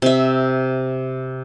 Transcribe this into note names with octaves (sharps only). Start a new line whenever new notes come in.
C3 E5